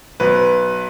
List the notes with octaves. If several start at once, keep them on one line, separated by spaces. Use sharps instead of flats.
B1 B4